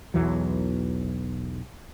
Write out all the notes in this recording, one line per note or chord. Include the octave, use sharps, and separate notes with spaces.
B1 E2 E3 F#3